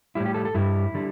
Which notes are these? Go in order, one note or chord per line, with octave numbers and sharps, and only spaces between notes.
A2 G3 E4
G4
A4
A4
G2 G3 E4
D3 G3